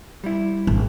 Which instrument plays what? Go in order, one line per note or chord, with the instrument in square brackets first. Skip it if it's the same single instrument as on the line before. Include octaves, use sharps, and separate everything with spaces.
[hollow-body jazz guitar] G3 E4
[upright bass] G#1